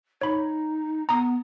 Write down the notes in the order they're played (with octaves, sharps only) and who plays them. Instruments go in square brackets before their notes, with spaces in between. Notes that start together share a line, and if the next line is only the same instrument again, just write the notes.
[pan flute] D#4 [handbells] C#5 B5
[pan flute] B3 [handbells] A#5 D#6